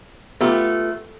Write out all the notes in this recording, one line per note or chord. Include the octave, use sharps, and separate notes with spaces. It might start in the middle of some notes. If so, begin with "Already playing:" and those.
A3 B3 F4 G4